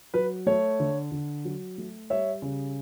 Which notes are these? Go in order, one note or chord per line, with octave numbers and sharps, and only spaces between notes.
F#3 B4
A3 C#5
D3
D3
F#3
A3
G3 C#5 E5
C#3